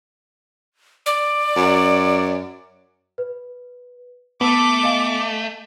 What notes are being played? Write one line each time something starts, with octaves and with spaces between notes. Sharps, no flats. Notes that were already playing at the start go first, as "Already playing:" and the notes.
D5
F#2
B4
A3 B3 A5 D6 E6
D#5 F5 G#5